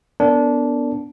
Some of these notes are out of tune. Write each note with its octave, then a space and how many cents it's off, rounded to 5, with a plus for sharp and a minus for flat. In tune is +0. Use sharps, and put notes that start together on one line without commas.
B3 +0 D4 -15 A#4 -35